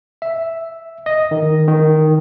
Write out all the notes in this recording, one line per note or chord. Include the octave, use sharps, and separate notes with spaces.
E5
D#5
D#3
D#3